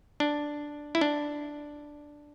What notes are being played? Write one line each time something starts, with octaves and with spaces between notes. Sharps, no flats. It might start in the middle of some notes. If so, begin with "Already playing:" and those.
D4
E4
D4